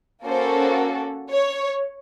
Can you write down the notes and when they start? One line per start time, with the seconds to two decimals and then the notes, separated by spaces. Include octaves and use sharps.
0.24 A#3 C#4 F#4 A4 C5
1.30 C#5